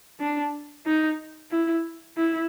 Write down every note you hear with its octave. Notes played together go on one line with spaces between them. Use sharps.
D4
D#4
E4
E4